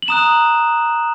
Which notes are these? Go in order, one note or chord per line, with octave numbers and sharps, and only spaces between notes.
F#7
A#5 D#6 F#6 E7